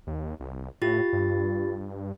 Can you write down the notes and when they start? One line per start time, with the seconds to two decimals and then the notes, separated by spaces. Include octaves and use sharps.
0.07 D#2
0.40 C2
0.82 A2 F4 G4 A6
1.13 G2